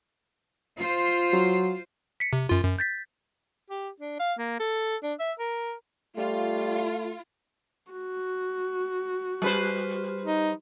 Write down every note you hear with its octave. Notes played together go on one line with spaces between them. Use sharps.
F4 C5
F#3
B6 C#7
C3
F#2 F4
F#2
G6 A6 B6
G4
D4
F5
A#3
A4
D4
E5
A#4
G3 A3 F4
F#4
G3 B4 C5
D#4